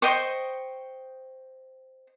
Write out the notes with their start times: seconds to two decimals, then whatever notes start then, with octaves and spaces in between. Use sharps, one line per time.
0.02 C5 D#5 G5 C#6